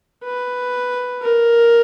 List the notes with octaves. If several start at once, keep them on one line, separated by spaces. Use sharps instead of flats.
B4
A#4